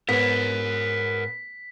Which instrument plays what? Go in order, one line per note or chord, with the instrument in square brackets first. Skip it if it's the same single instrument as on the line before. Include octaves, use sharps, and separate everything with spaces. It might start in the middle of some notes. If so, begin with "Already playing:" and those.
[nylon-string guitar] G#2 [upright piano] B3 [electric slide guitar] A#4 C#5 [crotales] B6